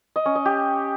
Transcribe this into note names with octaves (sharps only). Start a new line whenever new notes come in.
D#5
C#4
D#5
G4